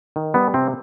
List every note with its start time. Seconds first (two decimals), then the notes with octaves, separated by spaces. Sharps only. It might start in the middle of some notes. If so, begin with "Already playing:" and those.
0.16 D#3
0.34 G3 B3
0.54 C3 C4